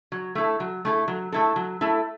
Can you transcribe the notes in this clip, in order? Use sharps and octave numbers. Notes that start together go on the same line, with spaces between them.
F#3
A3 E4 A4
F#3
A3 E4 A4
F#3
A3 E4 A4
F#3
A3 E4 A4